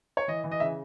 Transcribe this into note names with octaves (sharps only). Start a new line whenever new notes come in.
C#5
E3 D#5
E3
D#5
C#3 E5